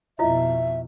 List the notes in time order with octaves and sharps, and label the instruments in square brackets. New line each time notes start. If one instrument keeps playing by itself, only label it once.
[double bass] F2 B2 [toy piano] E4 F4 D#5 [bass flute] E5